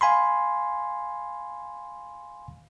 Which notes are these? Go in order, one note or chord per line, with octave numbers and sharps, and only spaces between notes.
F5 G#5 B5 C6